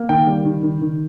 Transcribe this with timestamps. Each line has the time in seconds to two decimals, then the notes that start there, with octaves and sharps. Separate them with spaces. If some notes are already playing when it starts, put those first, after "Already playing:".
Already playing: A#3
0.09 D#3 G5
0.27 G3
0.45 D#3
0.63 D#3
0.82 D#3